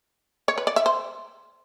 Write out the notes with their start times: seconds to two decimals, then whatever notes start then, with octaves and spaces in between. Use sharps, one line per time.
0.48 C#5
0.58 B4
0.67 D5
0.76 E5
0.86 C5